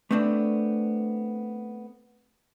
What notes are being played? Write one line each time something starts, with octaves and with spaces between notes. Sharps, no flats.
A3 B3 C4 D4